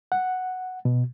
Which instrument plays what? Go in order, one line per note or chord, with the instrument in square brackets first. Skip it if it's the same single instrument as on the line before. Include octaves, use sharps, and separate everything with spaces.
[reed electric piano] F#5
B2